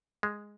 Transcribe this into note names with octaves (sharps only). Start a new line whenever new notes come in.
G#3